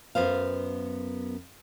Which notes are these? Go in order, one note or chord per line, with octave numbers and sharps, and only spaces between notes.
F#2 D#3 B3 C5 F5